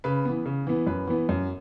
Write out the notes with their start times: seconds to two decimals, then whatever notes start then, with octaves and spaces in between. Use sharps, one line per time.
0.04 C#3 B4
0.25 E3 B3
0.46 C#3
0.67 E3 B3
0.87 F#2 B4
1.08 E3 B3
1.29 F#2